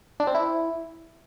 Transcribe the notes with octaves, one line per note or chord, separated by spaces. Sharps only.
D4
C4
E4